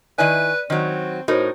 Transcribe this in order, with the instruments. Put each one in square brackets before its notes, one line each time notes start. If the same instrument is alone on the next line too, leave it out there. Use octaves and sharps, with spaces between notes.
[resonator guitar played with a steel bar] D#3 E4 G#5 [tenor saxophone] B4 [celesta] D5 D#7
[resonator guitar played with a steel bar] D#3 F#3 [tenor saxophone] C4
[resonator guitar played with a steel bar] A2 D#4 A#4 [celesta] F#4 C5 C#5